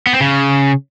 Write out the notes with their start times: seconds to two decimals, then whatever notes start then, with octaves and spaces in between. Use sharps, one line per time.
0.07 B3
0.13 C4
0.20 C#3